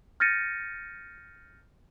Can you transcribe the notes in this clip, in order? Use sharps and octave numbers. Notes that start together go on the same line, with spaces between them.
F6 G6 A6 A#6 C#7 D#7